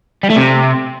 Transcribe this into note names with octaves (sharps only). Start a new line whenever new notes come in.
G3
A3
C3